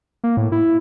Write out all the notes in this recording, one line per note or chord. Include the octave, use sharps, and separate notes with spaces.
A#3
A2
E4